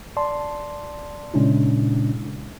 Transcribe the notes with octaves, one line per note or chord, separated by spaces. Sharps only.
D5 A5 C6
A#2 C#3 G#3 C#4 D4 E4